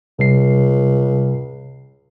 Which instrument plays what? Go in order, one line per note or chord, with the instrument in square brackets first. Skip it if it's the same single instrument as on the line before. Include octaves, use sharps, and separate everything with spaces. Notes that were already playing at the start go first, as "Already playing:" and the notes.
[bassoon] C#2 [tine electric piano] C3 G3 C7